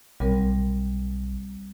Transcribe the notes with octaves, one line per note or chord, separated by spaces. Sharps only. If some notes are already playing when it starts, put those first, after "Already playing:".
B1 G3 C4 A#4